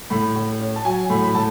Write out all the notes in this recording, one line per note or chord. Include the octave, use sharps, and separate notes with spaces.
A2 B5
A2
C#4
A5
F#3 G#5
A2 B5
B5
A2 A5